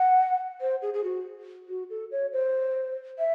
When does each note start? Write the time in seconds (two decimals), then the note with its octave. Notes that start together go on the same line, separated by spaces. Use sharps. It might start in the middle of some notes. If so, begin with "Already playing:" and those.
Already playing: F#5
0.61 C5
0.82 G#4
0.94 G#4
1.04 F#4
1.69 F#4
1.90 A4
2.12 C#5
2.33 C5
3.19 E5